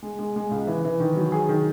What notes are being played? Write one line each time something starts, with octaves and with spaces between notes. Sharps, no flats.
G#3
G#3
G#3
C#2
E3
E3
D#3
F#3
G#4
D#3